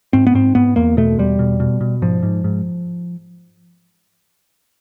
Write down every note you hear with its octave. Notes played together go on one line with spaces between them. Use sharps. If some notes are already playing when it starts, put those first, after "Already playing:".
G#2 C4
B3
G#2 C4
G#2 B3
E2 A#3
B2 A3
E2 G3
B2
B2
B2
G#2 F3
G#2
G#2